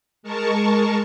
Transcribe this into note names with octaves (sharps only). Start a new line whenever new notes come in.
G#3 A#4 A5 C#6